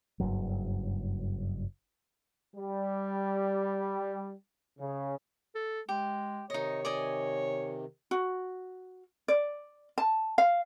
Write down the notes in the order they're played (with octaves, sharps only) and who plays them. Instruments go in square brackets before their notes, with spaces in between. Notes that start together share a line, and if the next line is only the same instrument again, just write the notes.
[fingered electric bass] F#1 G2 F#3
[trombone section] G3
C#3
[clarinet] A4
[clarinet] G#3 [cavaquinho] G4
[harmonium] C3 D#3 [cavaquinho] D#4 D#5 [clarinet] C#5
[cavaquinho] D5 D#5 G#5
[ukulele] F#4
D5
A5
F5